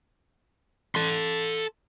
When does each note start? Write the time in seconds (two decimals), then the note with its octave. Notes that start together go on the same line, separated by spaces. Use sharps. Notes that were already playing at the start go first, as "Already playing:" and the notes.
0.95 A4 C6